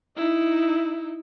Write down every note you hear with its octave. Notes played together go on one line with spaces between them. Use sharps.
D#4 E4